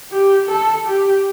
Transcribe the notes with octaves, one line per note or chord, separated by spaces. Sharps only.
G4
A4
G4